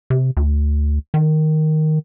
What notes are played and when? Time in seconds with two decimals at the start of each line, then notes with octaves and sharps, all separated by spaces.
0.10 C3
0.37 D2
1.14 D#3